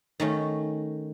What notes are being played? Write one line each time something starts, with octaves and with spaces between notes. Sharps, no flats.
D#3 A3 C#4